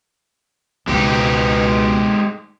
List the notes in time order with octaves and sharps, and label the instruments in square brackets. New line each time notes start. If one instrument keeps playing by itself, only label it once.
[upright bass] C#2 [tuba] B2 [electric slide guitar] G#3 D#4 G4